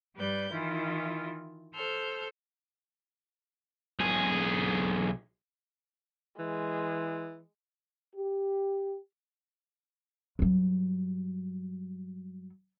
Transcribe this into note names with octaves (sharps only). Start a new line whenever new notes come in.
G2 G3 B4 D5 G6
D#3 E3 E4 F4
A4 C5 E6 F6 G6
B1 G#4
E3 G#3
G4
G2 F#3